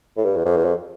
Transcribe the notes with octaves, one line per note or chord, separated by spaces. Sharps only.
A2
G2
E2
F2
E2
F2